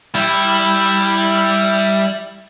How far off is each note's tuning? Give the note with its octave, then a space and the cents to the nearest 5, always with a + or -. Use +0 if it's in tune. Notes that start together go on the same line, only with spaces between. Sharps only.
G3 +0 E4 +0